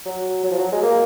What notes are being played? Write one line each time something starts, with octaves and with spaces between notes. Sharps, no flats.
F#3
F#3
F3
F#3
G#3
A#3